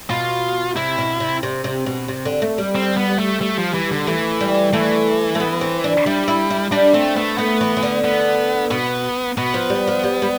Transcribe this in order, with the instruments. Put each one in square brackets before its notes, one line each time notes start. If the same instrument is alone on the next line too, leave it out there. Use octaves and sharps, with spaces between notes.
[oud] B2 [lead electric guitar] F4
[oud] C3 [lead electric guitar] E4
[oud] B2
C3
C3
C3
B2
C3
D3
A3
G3
[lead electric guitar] C4
B3
A3
A3
F3
E3
D3
[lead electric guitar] E3 [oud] A3
[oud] G3
[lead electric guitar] E3 [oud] A3
[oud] A3
B3
C4
D4
[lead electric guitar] G3 [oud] E4
[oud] E4
E4
[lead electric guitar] G3 [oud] D4
[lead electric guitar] A3 [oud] C4
[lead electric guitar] A3 [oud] B3
[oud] A3 [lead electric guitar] B3
[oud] E3
E3
D3
[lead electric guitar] B3
[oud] B2 [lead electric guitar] B3
[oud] B2 [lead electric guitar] B3
[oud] F3
G3
F3
G3
G3